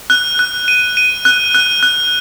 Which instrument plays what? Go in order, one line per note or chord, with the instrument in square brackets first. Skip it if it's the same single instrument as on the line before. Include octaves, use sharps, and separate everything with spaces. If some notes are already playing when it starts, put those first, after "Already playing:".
[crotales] F#6
F#6
D#7
D#7
F#6
F#6
F#6